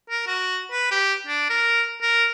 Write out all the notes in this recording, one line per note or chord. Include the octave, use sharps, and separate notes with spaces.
A#4
F#4
B4
G4
D4
A#4
A#4